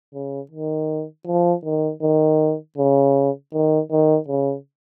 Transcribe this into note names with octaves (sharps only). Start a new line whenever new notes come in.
C#3
D#3
F3
D#3
D#3
C#3
D#3
D#3
C#3